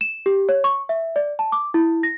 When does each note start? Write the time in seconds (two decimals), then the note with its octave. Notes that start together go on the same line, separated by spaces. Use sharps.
0.01 E7
0.26 G4
0.49 C#5
0.64 C#6
0.89 E5
1.16 D5
1.39 A5
1.52 D6
1.74 E4
2.03 A#6